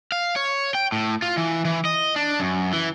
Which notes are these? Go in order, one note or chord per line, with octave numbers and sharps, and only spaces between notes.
F5
C#5
G5
A2
F4
E3
E3
D#5
D4
F#2
E3